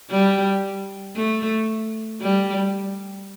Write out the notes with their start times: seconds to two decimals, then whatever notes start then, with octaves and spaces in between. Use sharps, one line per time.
0.10 G3
1.16 A3
2.21 G3